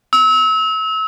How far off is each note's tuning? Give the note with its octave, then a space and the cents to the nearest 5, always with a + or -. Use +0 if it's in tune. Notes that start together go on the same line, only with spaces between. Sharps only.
E6 -30